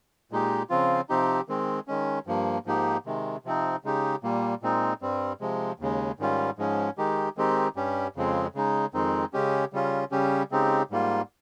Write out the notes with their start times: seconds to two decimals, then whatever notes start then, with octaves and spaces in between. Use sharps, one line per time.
0.31 A#2 G#3 D#4 G4
0.69 C#3 F3 C4 F4
1.09 C3 F3 C4 D#4 G4
1.49 D#3 G#3 C4
1.88 D#3 G#3 C#4
2.27 G2 F3 A#3
2.66 G#2 F3 A#3 D#4 G4
3.06 C3 D#3 G#3
3.45 C3 F3 C4 D#4
3.84 C#3 G#3 D#4 G4
4.23 A#2 G3 A#3
4.62 A#2 G#3 C4 D#4
5.02 G2 G3 C4
5.41 C3 F3 G#3
5.80 D#2 C#3 G#3
6.19 G#2 D#3 G3 C#4 F4
6.58 G#2 F3 G#3 C#4
6.98 D#3 G#3 D#4 G4
7.37 D#3 G#3 C4 D#4 G4
7.76 G2 G3 C#4 G4
8.16 F2 C#3 F3 G#3 C4
8.55 C#3 G#3 D#4
8.94 F2 D#3 G#3 C4 D#4
9.33 C#3 G#3 C#4 G4
9.73 C#3 G3 C#4 F4
10.11 C#3 G3 C#4 G4
10.52 C#3 G#3 C4 D#4 G4
10.91 G#2 G3 A#3 F4